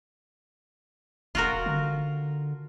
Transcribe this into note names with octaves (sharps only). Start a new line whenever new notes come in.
E1 F4 F#4 A#4
D3